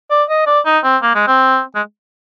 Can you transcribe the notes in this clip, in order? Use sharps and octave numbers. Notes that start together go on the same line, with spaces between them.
D5
D#5
D5
D#4
C4
A#3
G#3
C4
G#3